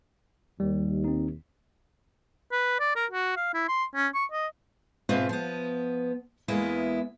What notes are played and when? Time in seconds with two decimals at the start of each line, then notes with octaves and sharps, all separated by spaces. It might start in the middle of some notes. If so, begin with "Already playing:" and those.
0.60 D#2 G3
1.04 C4 D#4
2.52 B4
2.80 D5
2.96 A#4
3.11 F#4
3.36 F5
3.54 E4
3.68 C6
3.95 C#4
4.14 C#6
4.32 D#5
5.09 G#2 B2 C4 F4 B4 E5
5.29 F3 B3
6.48 E2 G#3 A#3 B3 E4